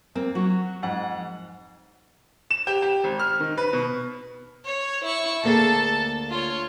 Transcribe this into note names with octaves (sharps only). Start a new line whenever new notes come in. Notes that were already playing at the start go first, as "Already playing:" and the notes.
A#3 C4
F#3 F#4
F2 G#2 F#5
E7
G4
G4
G#1
F6
D#3
B4
B2
C#5
E4 C#6
D2 A#3 G#4 A4 A5
F4 C#5